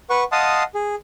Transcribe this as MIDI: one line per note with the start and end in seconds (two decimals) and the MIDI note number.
0.10 0.24 71
0.10 0.24 78
0.10 0.24 85
0.32 0.63 75
0.32 0.63 77
0.32 0.63 78
0.32 0.63 81
0.32 0.63 84
0.32 0.63 87
0.75 0.95 68